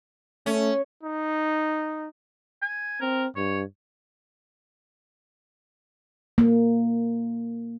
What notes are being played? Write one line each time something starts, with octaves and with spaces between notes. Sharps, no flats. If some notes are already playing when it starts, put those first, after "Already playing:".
A3 C#4
D#4
G#5
C4 A#4
G2 C#5
A#3